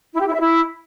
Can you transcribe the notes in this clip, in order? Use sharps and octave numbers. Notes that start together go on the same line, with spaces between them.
E4
G4
E4
E5
E4